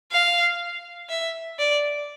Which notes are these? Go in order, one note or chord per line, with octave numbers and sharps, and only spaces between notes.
F5
E5
D5